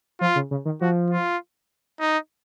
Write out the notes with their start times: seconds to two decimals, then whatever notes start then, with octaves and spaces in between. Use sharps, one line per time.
0.21 F3 F4
0.36 C#3
0.51 C#3
0.65 D#3
0.81 F3 F#4
1.10 F4
2.00 D#4